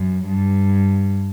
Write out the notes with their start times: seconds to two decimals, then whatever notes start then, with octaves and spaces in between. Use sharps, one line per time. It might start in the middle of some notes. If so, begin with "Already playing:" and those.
Already playing: F#2
0.26 G2